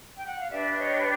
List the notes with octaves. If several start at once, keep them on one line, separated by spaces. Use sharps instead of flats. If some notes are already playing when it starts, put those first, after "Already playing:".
G5
F#5
F5
D4 G4 B4 D5 E5
E5
C#5 D#5